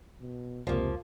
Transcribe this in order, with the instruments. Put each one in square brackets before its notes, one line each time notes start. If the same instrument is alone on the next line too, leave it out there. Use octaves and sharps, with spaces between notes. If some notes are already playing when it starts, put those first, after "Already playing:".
[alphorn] B2
[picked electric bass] F1 C#2 [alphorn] C3 [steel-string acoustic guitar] F3 A#3